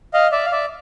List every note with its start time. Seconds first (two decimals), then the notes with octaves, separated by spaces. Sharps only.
0.14 D#5 F5
0.32 D5 E5
0.46 F5
0.52 D5 E5